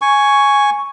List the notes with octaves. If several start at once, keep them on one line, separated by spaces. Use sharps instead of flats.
G#5 C#6